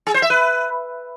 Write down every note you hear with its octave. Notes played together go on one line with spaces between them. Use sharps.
G#4
C5
E5
B4